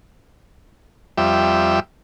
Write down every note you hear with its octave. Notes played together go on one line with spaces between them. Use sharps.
F2 G3 E5